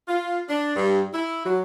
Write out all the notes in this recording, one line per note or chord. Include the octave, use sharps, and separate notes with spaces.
F4
D4
G2
E4
F#3